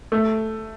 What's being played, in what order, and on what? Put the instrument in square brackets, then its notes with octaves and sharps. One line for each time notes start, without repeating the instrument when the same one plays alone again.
[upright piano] A3